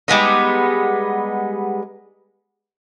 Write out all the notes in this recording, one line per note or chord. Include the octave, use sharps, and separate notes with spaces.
G3 G#3 B3 D#4